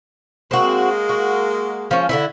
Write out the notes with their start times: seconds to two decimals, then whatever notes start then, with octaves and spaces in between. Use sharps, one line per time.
0.51 G#3 A#3 C4 F#4
1.09 F#4
1.91 F3 C#4
2.09 D3 E3 E4